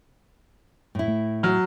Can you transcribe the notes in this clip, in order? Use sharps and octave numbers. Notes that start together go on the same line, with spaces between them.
A2 E4
A3
F#3 F6